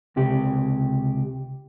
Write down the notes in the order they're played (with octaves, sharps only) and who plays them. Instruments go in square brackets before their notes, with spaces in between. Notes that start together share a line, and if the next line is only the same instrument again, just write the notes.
[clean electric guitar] C#2 C3 G4